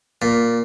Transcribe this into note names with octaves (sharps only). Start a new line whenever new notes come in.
A#2